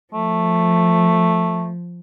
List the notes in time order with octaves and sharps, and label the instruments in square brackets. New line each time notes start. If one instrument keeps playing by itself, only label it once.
[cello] F3 [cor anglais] A3